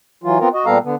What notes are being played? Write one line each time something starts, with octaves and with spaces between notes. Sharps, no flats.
E3 F#3 F4
B3 C4 F4 A#4
F#4 D#5
A#2 G3 B3 A4 F5 A#5
D3 B3